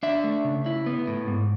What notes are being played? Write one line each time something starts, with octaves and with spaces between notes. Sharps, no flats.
D4 E5
A3
C#3
E4
B3
A2
G#2